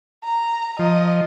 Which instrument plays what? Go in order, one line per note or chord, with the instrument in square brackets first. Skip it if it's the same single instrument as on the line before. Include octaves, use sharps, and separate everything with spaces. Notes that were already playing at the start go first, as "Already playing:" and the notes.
[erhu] A#5
[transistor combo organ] F3 [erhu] D#5